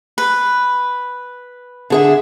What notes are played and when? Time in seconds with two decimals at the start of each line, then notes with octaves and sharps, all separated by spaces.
0.18 B4
1.90 D3 G#4 E5